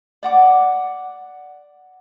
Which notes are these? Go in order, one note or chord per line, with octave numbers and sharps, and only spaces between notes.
D5 F#5 D6